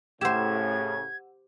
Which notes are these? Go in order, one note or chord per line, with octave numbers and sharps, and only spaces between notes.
A2 C#3 G4 C5 F#5 E6 G#6 E7